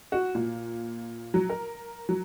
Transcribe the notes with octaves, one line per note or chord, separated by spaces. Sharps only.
F#4
A#2
F#3
A#4
F#3